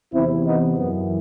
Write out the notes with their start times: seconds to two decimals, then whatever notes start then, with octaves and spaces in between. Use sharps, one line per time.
0.13 E2 C3 E3 C4 E4
0.45 B3 D#4
0.78 F#2 E3 B3